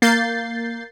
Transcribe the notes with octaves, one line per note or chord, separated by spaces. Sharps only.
A#3 G6 A6 C7